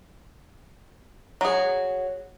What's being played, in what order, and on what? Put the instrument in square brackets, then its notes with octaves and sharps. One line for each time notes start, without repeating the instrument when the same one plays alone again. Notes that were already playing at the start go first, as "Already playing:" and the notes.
[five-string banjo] F#3 G#4